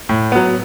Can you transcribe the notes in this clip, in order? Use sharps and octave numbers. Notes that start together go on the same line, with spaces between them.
A2
F#3 B3